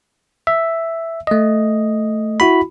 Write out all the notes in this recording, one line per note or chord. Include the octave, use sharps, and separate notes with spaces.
E5
A3 D#5
E4 F#4 B5